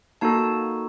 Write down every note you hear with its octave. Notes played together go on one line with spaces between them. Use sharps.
A#3 D#4 F#4 A4 A5